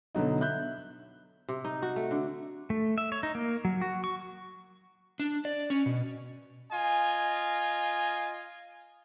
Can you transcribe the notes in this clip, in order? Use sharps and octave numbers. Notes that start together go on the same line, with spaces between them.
B2 D3 F#3 D#4
E5 F#6 G6
C3
D#4
F#4
A3
D3
A3
E5
C#5
D#4
A#3
F#3
F#4
C#6
D4
D5
C#4
B2
F4 D#5 G#5